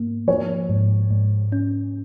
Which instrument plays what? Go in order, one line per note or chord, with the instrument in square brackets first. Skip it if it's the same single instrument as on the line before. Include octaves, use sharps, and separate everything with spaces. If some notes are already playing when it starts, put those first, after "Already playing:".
Already playing: [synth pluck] G#2 A#3
[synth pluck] F3 [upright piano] C#5
[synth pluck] G#2
G#2
C#4